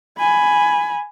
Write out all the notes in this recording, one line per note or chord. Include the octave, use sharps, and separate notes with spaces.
G#5 B5